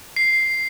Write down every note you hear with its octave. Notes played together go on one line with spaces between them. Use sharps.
C7